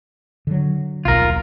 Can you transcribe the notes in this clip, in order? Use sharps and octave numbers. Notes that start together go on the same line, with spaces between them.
D3 F#3
D#1 B1 F4 A#4